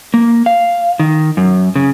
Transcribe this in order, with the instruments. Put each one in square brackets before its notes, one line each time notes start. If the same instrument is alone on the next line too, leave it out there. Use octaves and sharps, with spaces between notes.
[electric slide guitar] A#3
F5
D#3
F#2
C#3